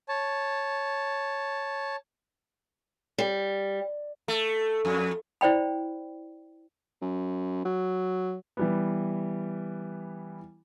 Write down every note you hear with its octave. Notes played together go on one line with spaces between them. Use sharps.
C#5 A5
G3
A3
F2
E4 C5 D5 G5 B5
F#2
F#3
E3 G3 B3